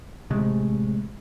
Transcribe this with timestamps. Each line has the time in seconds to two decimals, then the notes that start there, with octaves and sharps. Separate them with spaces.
0.30 A1 C3 G#3 A3